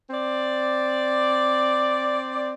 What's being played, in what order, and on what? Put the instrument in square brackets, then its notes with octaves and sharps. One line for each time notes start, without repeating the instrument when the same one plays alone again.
[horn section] C4 D5